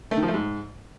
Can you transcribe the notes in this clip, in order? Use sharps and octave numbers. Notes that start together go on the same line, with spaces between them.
A3
D#3
F3
A3
G#2